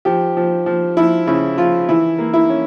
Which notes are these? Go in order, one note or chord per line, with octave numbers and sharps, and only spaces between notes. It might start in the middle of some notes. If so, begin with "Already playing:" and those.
F3 G4
F3
F3
F3 E4
C#3 E4
F3 F4
E3 E4
A#3
E4
C#4